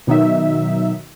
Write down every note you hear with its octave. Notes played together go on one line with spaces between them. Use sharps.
B2 D#3 F#3 D#4 E5